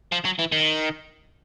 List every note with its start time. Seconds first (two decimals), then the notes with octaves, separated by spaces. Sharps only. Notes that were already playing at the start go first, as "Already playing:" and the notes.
0.12 F3
0.25 F#3
0.39 E3
0.52 D#3